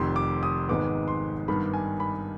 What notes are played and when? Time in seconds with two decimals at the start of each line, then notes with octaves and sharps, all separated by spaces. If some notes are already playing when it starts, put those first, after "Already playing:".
Already playing: F1 F2 D#3 C6
0.16 D6
0.43 D#6
0.69 G#1 G#2 D#3 G#3 B3 D6
1.08 C6
1.48 G2 D#3 G3 B3 D4 B5
1.74 G#5
2.00 B5